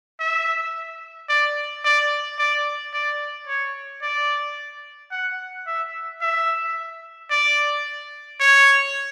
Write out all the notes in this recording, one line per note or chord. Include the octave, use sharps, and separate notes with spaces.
E5
D5
D5
D5
D5
C#5
D5
F#5
E5
E5
D5
C#5